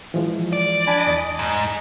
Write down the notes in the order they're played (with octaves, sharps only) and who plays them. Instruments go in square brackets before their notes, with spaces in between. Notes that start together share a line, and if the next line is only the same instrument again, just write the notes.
[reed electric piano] E3 F3 G#3
[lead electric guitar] D5
[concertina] D4 G#5 B5
[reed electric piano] E2 [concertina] D#5
[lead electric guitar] G#2